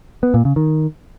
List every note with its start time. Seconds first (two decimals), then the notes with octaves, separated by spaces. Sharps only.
0.23 B3
0.34 A#2
0.45 C#3
0.56 D#3